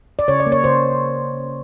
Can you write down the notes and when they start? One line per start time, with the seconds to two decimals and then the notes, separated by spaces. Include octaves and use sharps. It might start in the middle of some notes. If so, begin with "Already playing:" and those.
0.19 D5
0.28 C#3 C#5
0.40 D5
0.46 A#3
0.52 C#5
0.64 C#3 C5